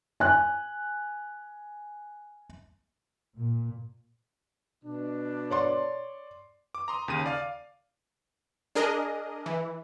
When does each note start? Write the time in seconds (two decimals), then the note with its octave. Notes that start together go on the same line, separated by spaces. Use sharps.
0.20 G#5 F#6
3.35 A#2
4.84 B2 D4
5.50 C#5 D5 C6
6.75 D6
6.88 A#5 C6 D#6
7.08 D#2 C#3 D#7
7.26 D5 F5
8.75 D4 G#4 A#4 D#5
9.46 E3